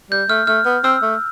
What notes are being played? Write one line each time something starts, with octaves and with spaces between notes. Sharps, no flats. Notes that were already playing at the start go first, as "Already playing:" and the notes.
G3 G6
A3 F6
A3 F6
B3
C4 E6
A3